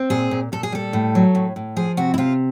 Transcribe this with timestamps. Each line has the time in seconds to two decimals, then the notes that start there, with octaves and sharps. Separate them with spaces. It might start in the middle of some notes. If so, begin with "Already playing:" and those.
Already playing: C4
0.10 A#2 G#4
0.31 A#2
0.52 A#2 A4
0.63 G#4
0.72 G3 A4
0.93 A2
1.15 F#3
1.35 A2
1.56 A2
1.76 F3 G#4
1.97 C3 F#4
2.14 E4
2.18 C3 F4